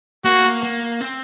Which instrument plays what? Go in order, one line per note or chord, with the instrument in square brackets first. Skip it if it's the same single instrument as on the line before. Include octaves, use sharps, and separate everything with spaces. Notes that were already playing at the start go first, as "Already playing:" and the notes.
[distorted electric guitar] A#3 [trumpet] F#4
[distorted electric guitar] A#3
C4